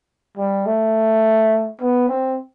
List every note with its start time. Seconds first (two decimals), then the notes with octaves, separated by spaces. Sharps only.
0.37 G3
0.66 A3
1.81 B3
2.09 C4